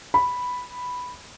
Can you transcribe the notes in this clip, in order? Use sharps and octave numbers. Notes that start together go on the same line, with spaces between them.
B5